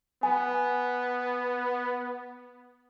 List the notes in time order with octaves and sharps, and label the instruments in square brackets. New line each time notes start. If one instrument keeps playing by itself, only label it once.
[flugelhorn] B3 [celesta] G#5